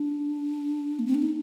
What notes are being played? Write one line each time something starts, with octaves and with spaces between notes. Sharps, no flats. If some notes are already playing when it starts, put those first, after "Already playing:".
Already playing: D4
A#3
C4
D4
D#4